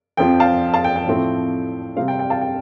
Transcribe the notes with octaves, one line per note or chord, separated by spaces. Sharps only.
F2 F3 C4 G5
F5 A5
F5 A5
G5
G5
A2 F3 A3 C4
C3 G3 C4 F5
G5
G5
F5 A5
G5